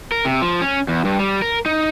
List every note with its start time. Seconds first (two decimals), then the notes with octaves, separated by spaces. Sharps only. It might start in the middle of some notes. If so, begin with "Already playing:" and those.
0.12 A#4
0.25 C3
0.42 F3
0.61 C#4
0.88 E2
1.05 G2
1.19 G3
1.42 A#4
1.66 D#4